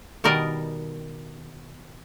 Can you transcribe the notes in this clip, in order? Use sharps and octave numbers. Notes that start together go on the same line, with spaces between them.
B2 D#3 G3 A#4 D5 D#5